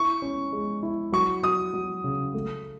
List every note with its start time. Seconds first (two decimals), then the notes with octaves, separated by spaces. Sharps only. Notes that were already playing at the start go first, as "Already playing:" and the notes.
Already playing: E4 C#6
0.22 C#4
0.52 G#3
0.83 E4
1.12 F#3 C#6
1.43 F#3 D#6
1.74 F#3
2.04 C#3
2.34 A3